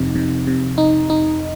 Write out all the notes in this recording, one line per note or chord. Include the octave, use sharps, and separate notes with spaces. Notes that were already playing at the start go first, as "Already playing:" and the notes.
Already playing: F2 C3 D#4
C3
C3
D#4
D#4